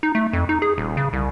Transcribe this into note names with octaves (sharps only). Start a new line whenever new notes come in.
D#4
A3
F2
D#4
G#4
D#1
C#3
C2